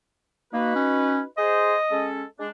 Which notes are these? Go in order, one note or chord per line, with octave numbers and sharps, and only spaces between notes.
A#3 D#4 F#4 B4
C#4
G#4 C5 D#5
G#3 C#4 A4
G#3 D4